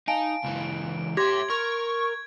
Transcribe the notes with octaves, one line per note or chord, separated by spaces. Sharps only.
D#4 F5 G#5 A5 D7
C#2 E3
G4 C#5 E5 C6 G#6 A#6
A#4 C#6